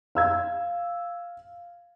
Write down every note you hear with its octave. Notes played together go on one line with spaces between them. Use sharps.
F5 E6 G#6